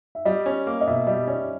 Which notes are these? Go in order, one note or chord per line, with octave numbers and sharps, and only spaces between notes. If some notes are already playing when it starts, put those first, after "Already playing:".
E5
G3 D#5
C#4
A#3
D#5
B2 E5
G3 D#5
C#4 D5